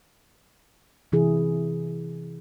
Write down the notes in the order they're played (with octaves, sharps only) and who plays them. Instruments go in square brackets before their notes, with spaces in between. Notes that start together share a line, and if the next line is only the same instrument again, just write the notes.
[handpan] C3 E3 E4 G#4